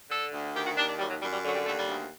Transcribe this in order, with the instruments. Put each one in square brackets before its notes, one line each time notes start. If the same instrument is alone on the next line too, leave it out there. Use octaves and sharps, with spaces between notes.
[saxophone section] D3 A4
D2
D#3 G4
F#4
D#2 D4
D4
F#2 G3
F#3
F#2 G3
G3
D3 F#3
G3
D#2 A3
G3
D2